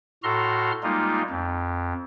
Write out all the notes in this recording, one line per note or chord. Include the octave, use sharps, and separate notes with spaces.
A2 F#4 A4 A#5 C6 F6
G3 G#3 A#3 D#4 F4
F2